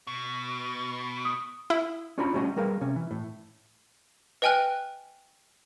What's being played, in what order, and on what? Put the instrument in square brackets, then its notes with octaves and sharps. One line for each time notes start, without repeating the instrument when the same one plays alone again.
[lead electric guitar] B2
[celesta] D#6
[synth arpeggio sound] E4
[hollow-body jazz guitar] C#4 D4 F4 C#5 A#5 B5
G3 A3 C#4 F#4 D#5
G3 G#4 A#4 B4 F5
C3 C#4
E3
A2
[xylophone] B4 D#5 G5 G#5 F6 F#6